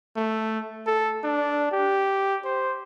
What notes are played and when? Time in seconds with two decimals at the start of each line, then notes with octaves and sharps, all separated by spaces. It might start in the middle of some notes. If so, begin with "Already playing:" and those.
0.16 A3
0.87 A4
1.24 D4
1.71 G4
2.45 C5